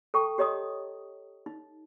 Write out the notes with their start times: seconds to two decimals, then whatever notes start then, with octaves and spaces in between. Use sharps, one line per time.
0.14 A4 G5 A5 C#6
0.38 G4 C#5 D#5 A#5 D#6
1.46 D#4